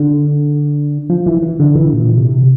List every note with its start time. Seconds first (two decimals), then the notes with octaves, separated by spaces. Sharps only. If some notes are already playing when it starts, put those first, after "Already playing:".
Already playing: D3
1.10 F3
1.26 E3
1.42 E3
1.60 D3
1.75 E3
1.93 A#2
2.17 C3